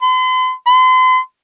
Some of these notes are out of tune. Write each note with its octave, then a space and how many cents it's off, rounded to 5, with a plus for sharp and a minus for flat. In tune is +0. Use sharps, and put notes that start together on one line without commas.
C6 -45
C6 -40